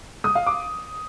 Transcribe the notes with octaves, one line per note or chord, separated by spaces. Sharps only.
D#6
F5
D6